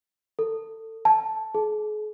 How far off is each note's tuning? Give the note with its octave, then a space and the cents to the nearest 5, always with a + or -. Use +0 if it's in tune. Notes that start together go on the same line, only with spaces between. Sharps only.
A4 +20
A5 -5
G#4 +40